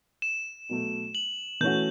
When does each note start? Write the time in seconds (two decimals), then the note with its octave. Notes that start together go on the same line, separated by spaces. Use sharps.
0.22 E7
0.69 B2 F#3 A3
1.15 F#7
1.61 E3 A3 C#4 F#4 G6